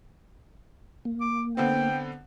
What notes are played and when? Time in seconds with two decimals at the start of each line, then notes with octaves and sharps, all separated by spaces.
1.05 A#3
1.21 D6
1.57 D3 B3 C4 G5